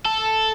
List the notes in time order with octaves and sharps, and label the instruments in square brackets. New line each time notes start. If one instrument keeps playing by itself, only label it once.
[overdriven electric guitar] A4